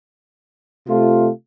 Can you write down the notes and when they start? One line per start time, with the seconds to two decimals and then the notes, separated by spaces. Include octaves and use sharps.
0.87 C3 A3 F4